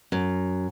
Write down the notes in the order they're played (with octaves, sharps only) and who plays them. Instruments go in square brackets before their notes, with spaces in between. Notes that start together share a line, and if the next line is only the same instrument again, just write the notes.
[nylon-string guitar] F#2